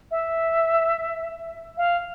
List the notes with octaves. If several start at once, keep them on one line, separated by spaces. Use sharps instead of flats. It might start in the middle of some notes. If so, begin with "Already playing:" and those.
E5
F5